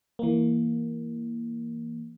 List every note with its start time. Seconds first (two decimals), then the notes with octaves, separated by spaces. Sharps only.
0.19 E3 A#3